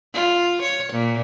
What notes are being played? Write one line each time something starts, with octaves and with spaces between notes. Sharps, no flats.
F4
C#5
A#2